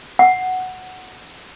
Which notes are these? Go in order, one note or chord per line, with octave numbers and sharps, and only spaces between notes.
F#5